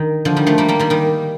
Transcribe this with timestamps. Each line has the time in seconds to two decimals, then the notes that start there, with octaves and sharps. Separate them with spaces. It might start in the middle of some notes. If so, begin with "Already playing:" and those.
Already playing: D#3
0.25 D3 F3
0.36 D#3 G3
0.47 F3 A3
0.58 G3 A#3
0.68 G3 A#3
0.79 D#3 G3
0.90 D#3 G3